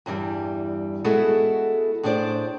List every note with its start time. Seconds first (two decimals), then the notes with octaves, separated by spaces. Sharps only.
0.06 E2 G2 E3 G3
1.04 G#3 B3 E4 F#4 G#4 A4
2.03 A2 D4 G#4 C5 D5